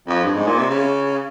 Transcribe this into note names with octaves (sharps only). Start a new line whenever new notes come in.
F2
G2
G#2
A#2
C3
C#3